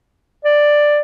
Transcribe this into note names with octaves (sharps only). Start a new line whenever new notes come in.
D5